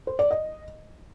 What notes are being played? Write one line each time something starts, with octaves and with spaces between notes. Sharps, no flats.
C5
D5
D#5